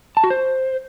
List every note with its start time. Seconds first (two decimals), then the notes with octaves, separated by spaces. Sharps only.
0.17 A5
0.24 F#4
0.30 C5